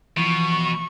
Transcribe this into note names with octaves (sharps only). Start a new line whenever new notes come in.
B2 E3 F3 C#6